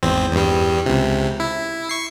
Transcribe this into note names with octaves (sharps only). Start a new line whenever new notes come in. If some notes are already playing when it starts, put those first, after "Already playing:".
G#1 E2 C4
E2 G2 G3
C#2 C3
E4
C#6 C7